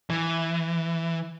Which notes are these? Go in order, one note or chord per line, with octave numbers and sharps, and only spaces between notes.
E3